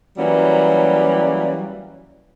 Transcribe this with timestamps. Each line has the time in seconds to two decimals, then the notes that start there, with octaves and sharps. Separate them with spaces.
0.17 E3 F#3 G3 A#3 C#4